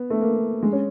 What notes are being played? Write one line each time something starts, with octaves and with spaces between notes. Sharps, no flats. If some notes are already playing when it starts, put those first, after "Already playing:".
Already playing: B3
A3
A#3
G#3
C#4